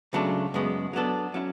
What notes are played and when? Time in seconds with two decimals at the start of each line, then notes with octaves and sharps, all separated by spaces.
0.13 C#2 C#3 F#3 A3 D4
0.54 F#2 C#3 G#3 B3
0.93 F#3 B3 D4 A4
1.34 F#3 C#4 E4